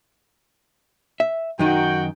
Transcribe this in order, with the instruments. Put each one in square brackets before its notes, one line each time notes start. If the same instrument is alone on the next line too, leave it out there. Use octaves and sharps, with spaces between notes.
[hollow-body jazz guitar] E5
[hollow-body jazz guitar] F#2 D#3 D#4 [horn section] F#4 G5